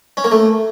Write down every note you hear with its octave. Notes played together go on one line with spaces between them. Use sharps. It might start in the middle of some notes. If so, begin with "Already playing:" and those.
C#4
A#3
A3